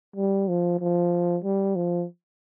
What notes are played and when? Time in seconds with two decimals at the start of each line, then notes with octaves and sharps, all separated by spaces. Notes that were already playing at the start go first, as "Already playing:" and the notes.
0.16 G3
0.49 F3
0.80 F3
1.44 G3
1.76 F3